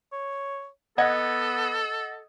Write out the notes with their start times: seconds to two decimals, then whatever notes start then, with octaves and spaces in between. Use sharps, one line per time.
0.12 C#5
0.98 B3 A4 D#5 F#5 G#6